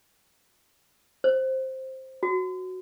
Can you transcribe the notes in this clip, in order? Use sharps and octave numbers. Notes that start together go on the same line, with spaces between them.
C5
F#4